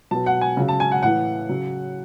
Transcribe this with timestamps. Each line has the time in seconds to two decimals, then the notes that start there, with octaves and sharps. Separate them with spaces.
0.11 B2 F#3 A5
0.26 F#5
0.41 G#5
0.57 C#3 F#3
0.68 A5
0.80 G#5
0.91 F#5
1.03 A2 E3 F#5
1.49 C#3 F#3